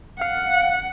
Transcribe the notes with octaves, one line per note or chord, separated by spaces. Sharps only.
F5 F#5